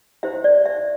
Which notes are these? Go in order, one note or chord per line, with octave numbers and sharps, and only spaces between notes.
E4 G4 C5 E5
D5
E5